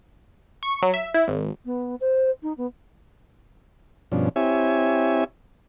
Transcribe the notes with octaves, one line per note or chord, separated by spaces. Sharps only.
C#6
F#3
E5
E4
G#1
B3
C5
D#4
B3
G2 B2 F3 C#4 D4
C4 E4 G4 C#5 E5 G#5